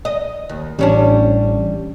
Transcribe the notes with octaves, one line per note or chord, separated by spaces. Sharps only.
D#5
D#2
A1 G3 C#4 D4